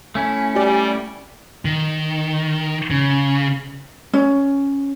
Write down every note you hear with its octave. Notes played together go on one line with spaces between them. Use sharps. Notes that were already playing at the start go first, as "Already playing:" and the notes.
A3 C#4 E4 G#5
G3 G4 D5
D#3
C#3
C#4